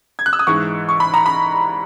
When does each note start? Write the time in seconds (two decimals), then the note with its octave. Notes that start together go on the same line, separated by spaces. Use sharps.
0.19 G#6
0.26 F#6
0.33 E6
0.39 D#6
0.47 G#2 E3 G#3 C#6
0.89 C#6
1.00 B5
1.14 A#5
1.26 B5